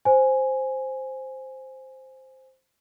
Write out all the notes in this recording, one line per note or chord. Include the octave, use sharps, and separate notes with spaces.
C5 G#5